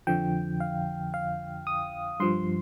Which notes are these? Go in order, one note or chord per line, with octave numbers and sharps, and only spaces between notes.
F2 D3 F3 G5
F5
F5
D#6
G2 F3 C6